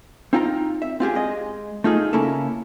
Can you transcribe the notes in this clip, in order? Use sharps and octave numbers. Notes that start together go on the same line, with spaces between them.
C4 D#4 F4 G5 A#5
E5
C4 F4 G4 G#4
G#3 D#5
A3 D#4 F4 G#4
C#3 A#3 C#4 E4 A4